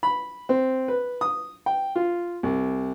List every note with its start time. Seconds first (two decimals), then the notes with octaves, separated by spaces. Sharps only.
0.03 B5
0.49 C4
0.88 B4
1.21 D#6
1.66 G5
1.96 F4
2.43 C2